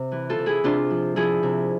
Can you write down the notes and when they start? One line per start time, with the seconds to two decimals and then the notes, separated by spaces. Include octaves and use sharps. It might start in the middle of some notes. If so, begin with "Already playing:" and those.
Already playing: C3
0.12 E3
0.30 F4 A4
0.38 C3
0.46 E4 G#4
0.64 C3 D4 F4
0.90 F3
1.16 F3 E4 G#4
1.43 C3